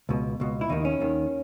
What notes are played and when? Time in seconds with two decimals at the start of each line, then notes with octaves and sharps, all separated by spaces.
0.09 C#2 B2
0.40 C#2 B2
0.61 E4
0.69 D#2 D#3 D#4
0.85 C#4
1.00 D#2 D#3